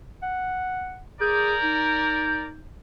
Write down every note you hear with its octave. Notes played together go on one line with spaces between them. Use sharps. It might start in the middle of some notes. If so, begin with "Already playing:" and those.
F#5
G#4 A#4 D5 G6
D#4